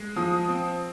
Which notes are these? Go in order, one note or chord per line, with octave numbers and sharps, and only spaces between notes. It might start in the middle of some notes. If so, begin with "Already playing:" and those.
Already playing: G#3
F3 D#6
C4